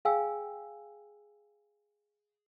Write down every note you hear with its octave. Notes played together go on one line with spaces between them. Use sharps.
G#4 F5 G5 G#5 E6